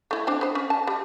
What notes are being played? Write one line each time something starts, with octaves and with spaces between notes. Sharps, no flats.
A3 E4
F3 C4 D4
B3 C5
C#4
A5
G3